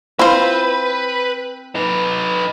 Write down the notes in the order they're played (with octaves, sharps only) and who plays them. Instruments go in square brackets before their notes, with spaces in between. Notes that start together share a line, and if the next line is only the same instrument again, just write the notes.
[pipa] C4 [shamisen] E4 F4 [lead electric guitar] B4
[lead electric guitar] D#4 B4